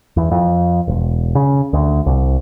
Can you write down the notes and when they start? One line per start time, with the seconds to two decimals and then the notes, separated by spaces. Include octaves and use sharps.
0.17 E2
0.31 F2
0.88 E1
1.35 C#3
1.73 D2
2.06 C2